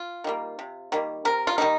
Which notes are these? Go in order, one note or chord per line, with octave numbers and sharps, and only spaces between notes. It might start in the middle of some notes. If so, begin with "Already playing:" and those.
Already playing: F4
D#3 G3 A#3
C3
D#3 G3 A#3
C3 A#4
F4
D#3 G3 A#3 D#4